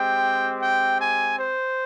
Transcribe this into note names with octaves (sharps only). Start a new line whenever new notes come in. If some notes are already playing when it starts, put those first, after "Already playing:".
Already playing: G#3 C4 G4 G5
G5
G#5
C5